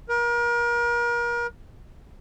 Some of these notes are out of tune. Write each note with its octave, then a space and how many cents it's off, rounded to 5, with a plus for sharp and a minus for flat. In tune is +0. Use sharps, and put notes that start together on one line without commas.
A#4 +35